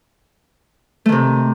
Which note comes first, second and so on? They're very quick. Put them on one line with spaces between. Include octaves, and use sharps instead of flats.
A3 D#3 C3